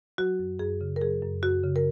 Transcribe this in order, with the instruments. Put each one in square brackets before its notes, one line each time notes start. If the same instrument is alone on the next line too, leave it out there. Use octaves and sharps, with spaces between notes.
[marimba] F#3 F#4
F#2
F#2 G#4
C#3
A#4
F#3 G#4
F#2
F#2 F#4
C#3
A#4